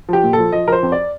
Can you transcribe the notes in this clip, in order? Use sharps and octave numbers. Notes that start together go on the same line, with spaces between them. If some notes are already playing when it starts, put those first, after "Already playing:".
F3 G4
A#2
A4
F3
F3 D#5
F3 A#4 C5
F2
D5